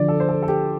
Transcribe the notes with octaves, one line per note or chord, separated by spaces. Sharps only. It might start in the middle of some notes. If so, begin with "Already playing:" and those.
Already playing: D3 F3 D4 D5
A4
C5
A4
A4
G4